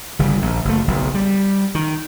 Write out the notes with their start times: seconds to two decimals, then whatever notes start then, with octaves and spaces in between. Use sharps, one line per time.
0.19 G1 C#3 G3
0.42 A#1
0.65 F#1 A3
0.88 F#1 B1
1.14 G3
1.75 D#3